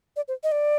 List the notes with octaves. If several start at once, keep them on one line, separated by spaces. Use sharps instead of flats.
D5
C5
D#5
D5